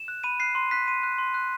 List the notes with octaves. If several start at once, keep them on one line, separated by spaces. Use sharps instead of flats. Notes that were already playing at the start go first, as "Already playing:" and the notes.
Already playing: E7
F#6
B5 D#7
F#6 C7
C6
F#6 B6
C6 D#7
F#6
C6
F#6